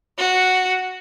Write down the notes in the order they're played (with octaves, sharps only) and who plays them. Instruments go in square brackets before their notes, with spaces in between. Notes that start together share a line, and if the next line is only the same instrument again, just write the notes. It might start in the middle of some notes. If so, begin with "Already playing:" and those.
[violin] F#4